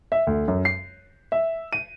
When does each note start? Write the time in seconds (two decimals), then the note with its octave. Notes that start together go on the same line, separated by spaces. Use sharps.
0.12 E5
0.27 D2
0.48 F#2
0.65 C7
1.32 E5
1.73 D#7